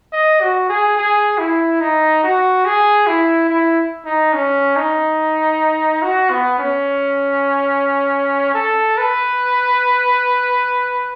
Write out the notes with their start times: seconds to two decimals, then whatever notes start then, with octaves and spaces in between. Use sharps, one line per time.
0.13 D#5
0.41 F#4
0.69 G#4
0.98 G#4
1.38 E4
1.81 D#4
2.23 F#4
2.66 G#4
3.07 E4
3.50 E4
4.06 D#4
4.33 C#4
4.76 D#4
6.02 F#4
6.30 B3
6.59 C#4
8.54 A4
8.98 B4